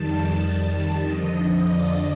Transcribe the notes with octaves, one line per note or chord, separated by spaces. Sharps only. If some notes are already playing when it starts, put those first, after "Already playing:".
Already playing: F2 D#3 G3 A5
F2 D3 F3 D#5
D5